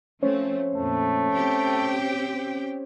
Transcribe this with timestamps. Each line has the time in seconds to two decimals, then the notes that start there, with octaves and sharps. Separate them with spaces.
0.23 F3 A3 C4 C#4 C5 C#5
0.75 F2 A#2 A3
1.32 C4 G4 G5